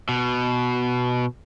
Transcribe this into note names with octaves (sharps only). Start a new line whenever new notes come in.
B2